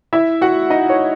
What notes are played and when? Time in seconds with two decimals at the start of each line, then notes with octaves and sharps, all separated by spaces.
0.13 E4 E5
0.41 F#4 F#5
0.70 D#4 D#5
0.89 C#5